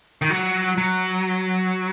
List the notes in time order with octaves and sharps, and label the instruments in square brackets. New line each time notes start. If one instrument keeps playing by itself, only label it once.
[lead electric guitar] D#3
F#3
F#3